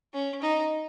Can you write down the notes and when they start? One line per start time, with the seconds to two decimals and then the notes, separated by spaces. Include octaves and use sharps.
0.14 C#4
0.42 D#4